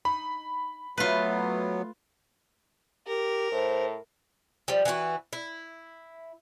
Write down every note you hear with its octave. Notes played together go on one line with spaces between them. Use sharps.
D#4 B5
F#3 A3 B3 E4 F4 B4
G4 A#4
A2 C5
F3 G3
E3 B3 F4 F#4
E4